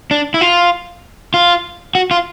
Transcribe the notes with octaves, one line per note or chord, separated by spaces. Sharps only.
D4
E4
F4
F4
F#4
F4